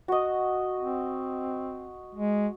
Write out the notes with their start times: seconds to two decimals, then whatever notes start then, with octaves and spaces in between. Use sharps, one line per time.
0.08 F#4 D#5
0.80 C4
2.15 G#3